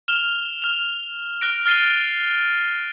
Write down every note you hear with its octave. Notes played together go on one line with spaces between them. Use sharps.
F6 E7 F7 G7
F6 F7
F6 F#6 A#6 D7
F6 A6 C7 D#7 G7